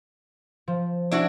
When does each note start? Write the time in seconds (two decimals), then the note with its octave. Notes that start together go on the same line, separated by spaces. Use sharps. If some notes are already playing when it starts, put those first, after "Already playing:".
0.68 F3
1.11 C#4 D4 E4 F#4